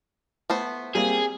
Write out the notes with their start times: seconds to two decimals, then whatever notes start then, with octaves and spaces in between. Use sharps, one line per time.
0.50 A3 B3 C5
0.95 G3 A#3 C4 G#4